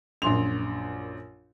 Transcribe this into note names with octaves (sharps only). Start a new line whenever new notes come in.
A#1 F#2 C6 F7